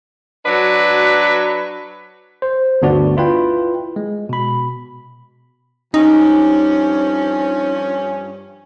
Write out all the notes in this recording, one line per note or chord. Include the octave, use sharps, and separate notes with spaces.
F#3 D4 F#4 B4
C5
G1 D2 B3 D4 F#4 D5
E4 F4 B4 G5
G#3
B2 B5
G2 F3 C#4 D#4